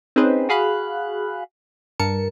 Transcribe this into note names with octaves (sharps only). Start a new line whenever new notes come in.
C4 C#4 D#4 G#4 B4 C5
F#4 G#4 F5 B5 F#6
G2 A#4 A5 C#7